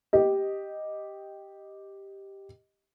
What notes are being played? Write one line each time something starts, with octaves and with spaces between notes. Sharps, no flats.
G4 D#5